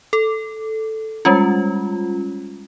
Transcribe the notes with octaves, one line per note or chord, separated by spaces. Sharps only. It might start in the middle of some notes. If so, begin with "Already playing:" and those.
A4
G3 G#3 C#4 F4